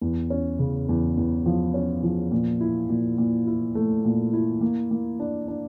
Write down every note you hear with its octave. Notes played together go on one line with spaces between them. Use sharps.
E2
C#4
C#3
E2
E2
F3
C#4
F3
A#2
E4
A#2
A#2
E4
A3
A#2
E4
A#3
A#3
D4
D4